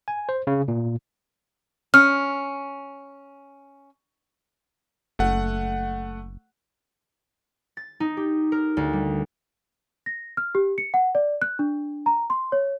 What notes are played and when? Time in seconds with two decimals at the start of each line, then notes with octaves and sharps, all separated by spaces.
0.08 G#5
0.29 C5
0.47 C#3
0.68 A#2
1.94 C#4 F6
5.19 F#1 A3 F#5
7.77 A6
8.00 D#4
8.17 G4
8.52 A#4
8.77 D2
8.93 G3
10.06 A#6
10.37 F6
10.55 G4
10.78 C#7
10.94 F#5
11.15 D5
11.42 F#6
11.59 D4
12.06 A#5
12.30 C6
12.52 C#5